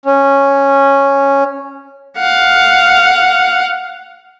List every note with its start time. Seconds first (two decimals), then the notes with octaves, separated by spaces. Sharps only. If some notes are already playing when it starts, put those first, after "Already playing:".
0.05 C#4
2.19 F5 F#5